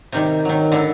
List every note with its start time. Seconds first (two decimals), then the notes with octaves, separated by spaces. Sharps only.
0.12 C3 D#3 G3
0.45 D#3 F#3
0.72 D3 E4 A4